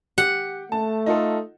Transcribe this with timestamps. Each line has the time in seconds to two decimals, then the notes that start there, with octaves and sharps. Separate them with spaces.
0.18 G4 F#5
0.72 A3 A5
1.06 D#4 F4 A4